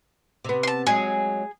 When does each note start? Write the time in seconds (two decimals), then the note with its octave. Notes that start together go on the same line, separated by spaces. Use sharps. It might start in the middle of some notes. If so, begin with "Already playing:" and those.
0.44 C3 B3
0.63 A5 C6
0.87 F#3 G#3 G#4